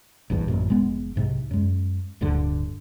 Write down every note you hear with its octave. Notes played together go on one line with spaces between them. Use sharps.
A#1 E2 G2
A1 F#2 A#2
F1 G#3 B3
B1 G#2 C3
F#2 G#3
D1 D2 G2 D3